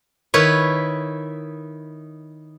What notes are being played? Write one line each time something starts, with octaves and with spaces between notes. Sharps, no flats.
D#3 E4 B4 C#5